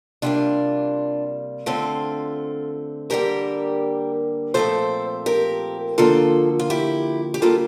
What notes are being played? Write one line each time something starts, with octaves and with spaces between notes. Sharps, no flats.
C3 G3 A#3 D4 F4
D3 A3 C4 F4 A4
D3 G3 A#3 G4 A#4
A#2 F3 A3 C4 A4 C5
G4 A#4
D3 F3 A#3 F4 A4
F4
E4 G4
G4
D3 G3 A#3 F4 A4